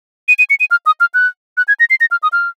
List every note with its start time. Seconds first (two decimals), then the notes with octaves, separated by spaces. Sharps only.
0.28 D#7
0.39 D#7
0.50 C#7
0.60 D#7
0.71 F6
0.86 D#6
1.00 F6
1.14 F#6
1.57 F#6
1.68 G#6
1.80 A#6
1.90 C7
2.01 A#6
2.11 F6
2.23 D#6
2.33 F6